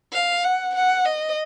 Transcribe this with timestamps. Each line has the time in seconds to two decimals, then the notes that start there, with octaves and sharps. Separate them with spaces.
0.13 F5
0.44 F#5
0.75 F#5
1.05 D#5